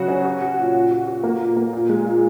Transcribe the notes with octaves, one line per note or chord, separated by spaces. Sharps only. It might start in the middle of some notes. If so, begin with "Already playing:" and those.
Already playing: C#3 F#3 F#4
C#4
F#4
F#4
A#2
A#2
F#4
F#4
A#3
A#2
A#3
A#2
G#3
A#2